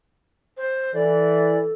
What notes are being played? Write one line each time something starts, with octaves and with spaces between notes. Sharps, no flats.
C5
E3 A4 D5